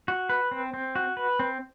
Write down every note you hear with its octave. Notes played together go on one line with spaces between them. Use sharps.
F#4
B4
C4
C4
F#4
B4
C4